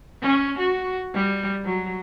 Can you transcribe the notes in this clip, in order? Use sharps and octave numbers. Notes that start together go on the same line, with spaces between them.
C#4
F#4
G3
F#3